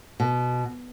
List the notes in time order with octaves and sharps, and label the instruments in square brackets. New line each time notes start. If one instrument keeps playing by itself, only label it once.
[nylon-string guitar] B2